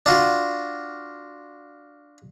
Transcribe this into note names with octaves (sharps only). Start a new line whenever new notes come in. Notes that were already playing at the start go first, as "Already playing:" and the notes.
D4 F4 F#4